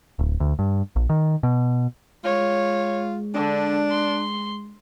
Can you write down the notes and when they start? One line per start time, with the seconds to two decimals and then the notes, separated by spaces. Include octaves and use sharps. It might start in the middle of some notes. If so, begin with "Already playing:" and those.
0.19 D1
0.40 D2
0.59 G2
0.96 A#1
1.10 D#3
1.43 B2
2.24 G#3 F4 C#5
3.34 D3 D4
3.91 C6